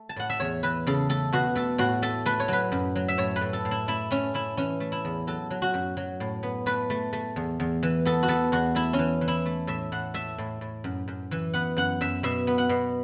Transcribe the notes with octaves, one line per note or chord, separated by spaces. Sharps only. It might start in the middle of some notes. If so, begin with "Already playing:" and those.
Already playing: A3
A5
A2 F#5
E5
E2 C#5
E3 B4
C#3 A4
A3 A4
B2 F#4
A3 A4
A2 F#4
A3 A4
A3 B4
C#5
F#3 B4
F#2
F#3
E5
A2 C#5
B4
A2
A4
A2
E4
A3 E4
A3 C#4
A3 E4
E3 C#4
A3
E4
E2
F#3 A4
F#3
F#4
F#2
F#3
A2
B3
A3 B4
A3
A3
E2
E2
E3
B3 A4
F#4
B3 A4
E2 F#4
A3 E4
C#4
E3
E3
E4
A3
A2 E5
A2 F#5
A3 E5
A2
A2
F#2
F#2
E3
B3 F#5
F#2 F#5
F#2 E5
B2 E5
B3
F#5
B2